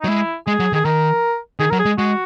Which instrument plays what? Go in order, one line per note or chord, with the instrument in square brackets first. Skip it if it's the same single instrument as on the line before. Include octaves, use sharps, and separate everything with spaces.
[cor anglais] D#4
[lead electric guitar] F#3
[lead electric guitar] G#3 [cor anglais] E4
[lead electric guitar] G#3 [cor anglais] G#4
[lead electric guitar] F#3
[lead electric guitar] D#3 [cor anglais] G#4
[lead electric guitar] D#3 [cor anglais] A#4
[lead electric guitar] D#3 [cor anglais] G#4
[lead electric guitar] F#3 [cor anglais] A#4
[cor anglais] G#4
[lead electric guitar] G#3
[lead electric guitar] G#3 [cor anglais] F#4